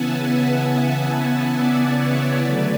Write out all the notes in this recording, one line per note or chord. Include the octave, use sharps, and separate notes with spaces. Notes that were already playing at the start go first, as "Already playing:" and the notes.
Already playing: C#3 E3 B3 E5 F#5 G#5 A5
E5 G#5
D5 F#5
C#5 E5
D3 F#3 A3 B4 D5